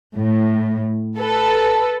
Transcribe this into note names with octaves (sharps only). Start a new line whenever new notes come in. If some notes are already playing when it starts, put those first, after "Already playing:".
A2
A4 B4